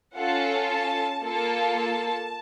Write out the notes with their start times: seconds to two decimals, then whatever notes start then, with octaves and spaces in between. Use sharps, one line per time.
0.16 C#4 F4 A4 F#5
0.70 A5
1.23 A#3 F4 A4 A5